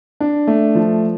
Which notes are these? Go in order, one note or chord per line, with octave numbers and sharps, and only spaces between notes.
D4
A3
F3